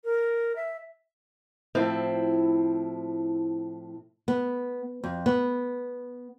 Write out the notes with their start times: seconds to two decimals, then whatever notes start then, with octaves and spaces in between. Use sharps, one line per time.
0.04 A#4
0.56 E5
1.75 A2 F3 C4 E4
4.28 B3
5.04 F2
5.26 B3